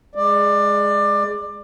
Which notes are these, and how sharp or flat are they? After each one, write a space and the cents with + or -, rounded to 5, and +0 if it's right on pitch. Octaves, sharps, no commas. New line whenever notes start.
G#3 +0 D5 +20